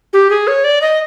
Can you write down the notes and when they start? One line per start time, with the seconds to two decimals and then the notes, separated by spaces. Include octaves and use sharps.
0.13 G4
0.30 G#4
0.47 C#5
0.64 D5
0.82 D#5